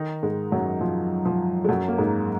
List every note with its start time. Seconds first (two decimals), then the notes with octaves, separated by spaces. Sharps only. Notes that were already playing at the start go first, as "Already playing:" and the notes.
Already playing: D#3 D#4
0.23 G#2 G#3
0.51 F#2 F#3
0.81 F3
1.25 F3
1.64 G#3
1.69 F#2 F#3
1.88 A#3
1.98 G#2 G#3